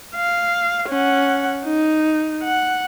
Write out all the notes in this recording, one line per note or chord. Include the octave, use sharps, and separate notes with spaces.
F5
C#4 F#5
D#4
F#5